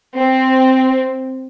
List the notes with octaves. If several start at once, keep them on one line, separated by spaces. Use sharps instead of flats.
C4